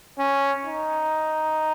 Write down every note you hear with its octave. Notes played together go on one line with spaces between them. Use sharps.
C#4
D#4